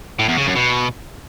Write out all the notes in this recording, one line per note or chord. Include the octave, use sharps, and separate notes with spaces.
A2
E2
C#3
F#2
B2